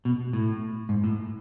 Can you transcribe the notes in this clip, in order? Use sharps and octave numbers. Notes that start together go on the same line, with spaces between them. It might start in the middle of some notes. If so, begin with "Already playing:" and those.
B2
A2
G#2
A2